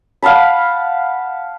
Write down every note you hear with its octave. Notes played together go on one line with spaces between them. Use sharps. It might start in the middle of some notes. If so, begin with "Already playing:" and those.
F5 F#5 A5 B5